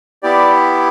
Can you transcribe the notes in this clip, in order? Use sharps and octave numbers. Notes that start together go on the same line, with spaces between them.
B3 E4 G4 D5